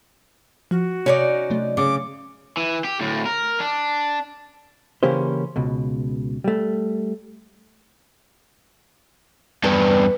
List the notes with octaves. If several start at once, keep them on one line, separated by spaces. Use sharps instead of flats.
F3 F#4
C3 C#4 D#4 C#5 D5
C3 F#3 A3
C#3 D6
E3
G4
D2 A2
A#4
D4
C#3 E3 A#3 C#4 G4 C5
C#2 B2
G3 A3
E2 G2 B4